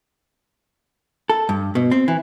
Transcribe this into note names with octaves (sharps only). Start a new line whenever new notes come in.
A4
G2
B2
C4
E3